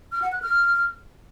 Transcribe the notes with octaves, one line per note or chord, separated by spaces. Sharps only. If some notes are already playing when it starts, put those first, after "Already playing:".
F6
F#5
F#6
F6